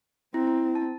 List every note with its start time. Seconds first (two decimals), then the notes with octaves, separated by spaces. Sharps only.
0.34 C4 E4
0.47 E4
0.75 A5